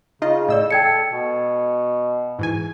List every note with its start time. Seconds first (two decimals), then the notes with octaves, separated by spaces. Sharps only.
0.22 C#3 D#4 F4 D#5
0.48 A2 D5 D#5 E6
0.70 A4 G5 G#6 C#7
1.11 B2
2.39 G#2 E3 G#5